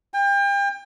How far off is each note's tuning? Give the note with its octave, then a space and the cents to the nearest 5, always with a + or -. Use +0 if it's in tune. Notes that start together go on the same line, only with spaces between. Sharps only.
G5 +35